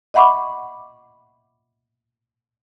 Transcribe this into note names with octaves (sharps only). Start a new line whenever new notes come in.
D#5 E5 F#5 B5 C#6 D6